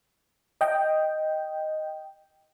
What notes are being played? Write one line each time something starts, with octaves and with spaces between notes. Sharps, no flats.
D#5 G5